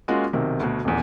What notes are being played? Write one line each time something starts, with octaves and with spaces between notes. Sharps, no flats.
G#3 A#3 C#4 F4 F#4
B1 C3 D#3
D2 B2
D#1 E2